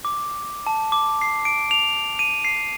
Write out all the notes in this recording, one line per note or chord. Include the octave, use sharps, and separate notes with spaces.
D6
A5
D6
C7
D7
F7
D#7
C7